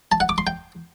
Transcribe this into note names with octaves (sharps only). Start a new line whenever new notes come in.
A5
F#5
D6
C6
G5